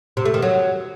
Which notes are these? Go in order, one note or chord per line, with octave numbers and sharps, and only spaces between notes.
C3
A3
D#3
F#3